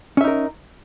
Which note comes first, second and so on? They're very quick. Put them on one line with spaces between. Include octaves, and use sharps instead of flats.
C#4 E5 D#4 A#4